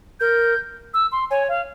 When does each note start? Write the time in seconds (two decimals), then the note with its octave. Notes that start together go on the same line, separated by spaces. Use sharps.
0.20 A#4 G6
0.94 E6
1.12 C6
1.30 C#5 G#5
1.48 F5